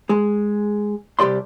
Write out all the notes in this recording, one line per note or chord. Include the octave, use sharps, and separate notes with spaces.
G#3 G#4
C2 D#3 G4 D5 C6